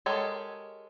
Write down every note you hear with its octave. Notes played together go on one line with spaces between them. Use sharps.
G#3 G4 A4 A#4 C#5